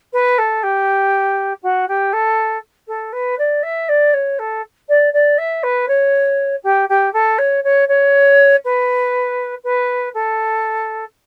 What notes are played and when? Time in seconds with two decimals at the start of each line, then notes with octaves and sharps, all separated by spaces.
0.13 B4
0.38 A4
0.63 G4
1.62 F#4
1.88 G4
2.12 A4
2.87 A4
3.12 B4
3.38 D5
3.62 E5
3.88 D5
4.13 C#5
4.39 A4
4.88 D5
5.13 D5
5.38 E5
5.63 B4
5.88 C#5
6.63 G4
6.89 G4
7.13 A4
7.38 C#5
7.64 C#5
7.88 C#5
8.64 B4
9.64 B4
10.14 A4